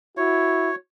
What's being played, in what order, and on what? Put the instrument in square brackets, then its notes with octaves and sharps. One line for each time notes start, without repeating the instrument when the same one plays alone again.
[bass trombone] E4 [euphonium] F#4 [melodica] C#5